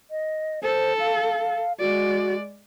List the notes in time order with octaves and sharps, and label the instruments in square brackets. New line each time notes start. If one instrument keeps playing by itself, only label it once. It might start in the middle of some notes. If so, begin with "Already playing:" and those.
[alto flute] D#5
[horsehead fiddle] A4 [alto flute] C5
[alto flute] F5
[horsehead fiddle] G#3 D5 [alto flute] F#4